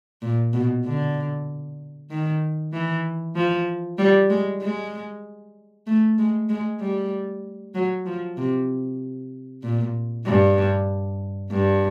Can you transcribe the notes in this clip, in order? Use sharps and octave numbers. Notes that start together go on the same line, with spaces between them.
A#2
B2
D3
D#3
E3
F3
G3
G#3
G#3
A3
G#3
G#3
G3
F#3
F3
C3
A#2
G2
G2